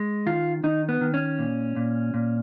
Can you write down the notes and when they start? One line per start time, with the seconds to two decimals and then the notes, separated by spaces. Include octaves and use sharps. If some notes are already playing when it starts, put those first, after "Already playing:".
Already playing: G#3
0.26 D#3 F4
0.64 D#3 D#4
0.89 B3
1.01 D#3
1.14 C#4
1.39 A#2
1.76 A#2
2.14 A#2